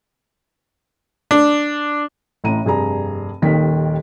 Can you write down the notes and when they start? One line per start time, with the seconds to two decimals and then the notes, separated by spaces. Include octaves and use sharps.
1.31 D4
2.44 A1 A2 A#5 D#7
2.65 F1 G2 G#4 A#5
3.42 D#1 D#2 D#3 D#4 A#4 B6